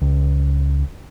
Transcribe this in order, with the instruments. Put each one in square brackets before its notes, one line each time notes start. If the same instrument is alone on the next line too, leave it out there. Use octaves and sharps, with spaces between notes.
[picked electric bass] C#2